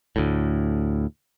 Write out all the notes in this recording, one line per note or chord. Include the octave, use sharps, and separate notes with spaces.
D2 A2